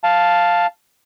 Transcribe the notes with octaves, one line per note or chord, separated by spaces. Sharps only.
F5 A5